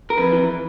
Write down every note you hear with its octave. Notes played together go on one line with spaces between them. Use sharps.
A#4
F2 B4
E3